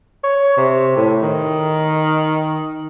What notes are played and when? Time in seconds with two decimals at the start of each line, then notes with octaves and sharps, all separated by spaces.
0.24 C#5
0.57 C3
0.97 A2
1.23 D#3